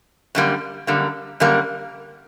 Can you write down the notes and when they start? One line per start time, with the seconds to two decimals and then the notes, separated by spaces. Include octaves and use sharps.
0.35 F#2 D3 G3 A#3
0.87 F#2 D3 G3 A#3
1.40 F#2 D3 G3 A#3